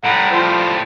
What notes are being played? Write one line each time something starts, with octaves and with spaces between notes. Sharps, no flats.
A2 G3 F#5 A#5
F3 C5